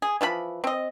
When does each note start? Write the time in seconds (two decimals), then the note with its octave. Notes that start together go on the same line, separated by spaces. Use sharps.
0.02 G#4
0.21 E3 F3 A4 B5
0.64 C4 D#5